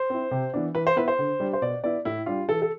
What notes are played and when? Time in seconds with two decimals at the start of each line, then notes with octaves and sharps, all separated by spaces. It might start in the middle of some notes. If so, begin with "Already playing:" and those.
Already playing: C5
0.10 C4 E4
0.31 C3
0.54 E3 B3 D4
0.75 E3 B4
0.87 C5
0.96 B3 E4 B4
1.08 C5
1.19 D3
1.40 G3 D4
1.53 C5
1.62 B2 D5
1.84 B3 E4 D5
2.05 A2 E4
2.26 G3 D4 F4
2.49 E3 A4
2.62 A4